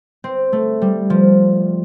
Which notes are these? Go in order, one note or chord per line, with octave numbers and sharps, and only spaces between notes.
C4
A3
G3
F3